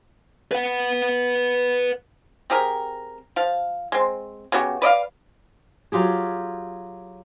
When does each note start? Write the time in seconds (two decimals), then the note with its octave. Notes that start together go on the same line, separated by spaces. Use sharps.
0.51 B4 F#5
2.50 C4 G4 G#4 A#4
3.36 F3 F5
3.92 G#3 C4
4.52 C#3 B3 F#4 G4
4.82 B4 D5 D#5 F5
5.92 F#3 F4 G4 G#4